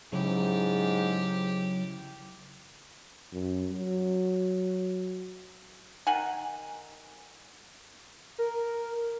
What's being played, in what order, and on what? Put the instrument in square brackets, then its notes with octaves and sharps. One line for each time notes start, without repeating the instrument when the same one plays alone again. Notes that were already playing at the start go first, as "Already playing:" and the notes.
[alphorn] G#2 [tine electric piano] C#3 E4 [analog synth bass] F#3 [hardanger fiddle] G4
[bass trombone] F#2
F#3
[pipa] D#3 F#5 G#5
[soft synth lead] A#4